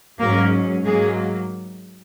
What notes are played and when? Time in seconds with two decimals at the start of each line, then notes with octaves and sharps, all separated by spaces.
0.19 G#2 F#3 A#3 C#4 A#4
0.84 G#2 F#3 G#3 A#3 G#4